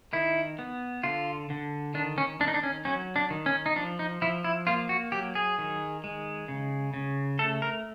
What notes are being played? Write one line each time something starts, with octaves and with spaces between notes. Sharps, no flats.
D#3 E4
B3
D3 F4
D3
D#3 D4
C#4
D#3 D4
D#4
D4
C#4
F#3 C#4
D4
D#3
C#4
D#4
F3 D4
D#4
F3 E4
E4
A#3 F4
F#4
F#3 G4
G#4
D#3
G#3
C#3
C#3
A3 A4
A#4